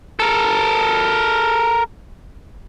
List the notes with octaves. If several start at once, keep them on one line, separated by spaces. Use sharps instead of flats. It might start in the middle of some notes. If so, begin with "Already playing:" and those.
A4 A#4